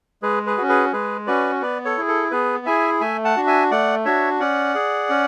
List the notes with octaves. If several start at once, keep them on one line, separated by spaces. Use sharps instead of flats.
G#3 G#4 B4
G#4 B4
C#4 F#4
G#4 B4
G#3 G#4 B4
C#4 F#4 B4 D5
B3 B4 D5
A4 C#5
E4 G#4
A4
B3 G#4 B4
E4 G#4 E5 G#5
A3 E5 G#5
F#5 A5
D4 F#4
E5 G#5
A3 D5 F#5
D4 F#4 C#5 E5
C#4 D5 F#5
G#4
C#4